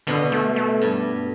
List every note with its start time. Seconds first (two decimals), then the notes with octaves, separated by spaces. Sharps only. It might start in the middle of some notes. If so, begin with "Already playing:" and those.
0.07 B2 D3
0.32 A3
0.56 A3
0.82 G2